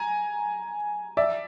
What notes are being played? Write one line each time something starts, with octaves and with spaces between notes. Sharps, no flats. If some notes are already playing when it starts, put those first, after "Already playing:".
Already playing: G#5 A#5
D5 E5